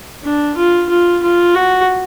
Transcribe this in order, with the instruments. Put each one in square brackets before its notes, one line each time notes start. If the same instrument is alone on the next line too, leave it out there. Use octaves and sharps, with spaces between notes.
[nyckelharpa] D4
F4
F4
F4
F#4